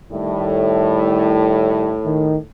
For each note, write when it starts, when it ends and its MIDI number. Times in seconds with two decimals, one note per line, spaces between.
0.12 2.43 45
0.12 1.93 51
0.12 1.93 55
0.12 1.93 64
2.05 2.36 51